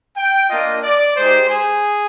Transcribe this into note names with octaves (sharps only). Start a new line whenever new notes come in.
G5
A#3 D4 F4 D#5
D5
G#3 D#4 G4 C5
G#4